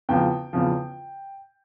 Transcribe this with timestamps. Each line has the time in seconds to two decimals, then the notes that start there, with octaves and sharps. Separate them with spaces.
0.09 E2 C#3 F3 G5
0.53 E2 C#3 F3